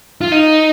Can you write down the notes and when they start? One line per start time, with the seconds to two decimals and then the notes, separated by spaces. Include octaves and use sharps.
0.21 F4
0.32 D#4